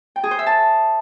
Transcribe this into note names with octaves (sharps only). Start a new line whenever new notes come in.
G5
G#4
C5
E5
A5